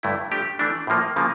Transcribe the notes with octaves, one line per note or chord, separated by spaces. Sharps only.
G2 D3 A3 E4
F3 A3 D4 G4
E3 A3 D4
A2 F3 A#3
C#3 F3 A#3